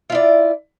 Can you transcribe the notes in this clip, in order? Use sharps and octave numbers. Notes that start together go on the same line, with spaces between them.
E4 F4 D5